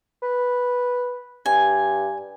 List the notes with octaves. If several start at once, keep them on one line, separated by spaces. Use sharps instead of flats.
B4
G2 G#5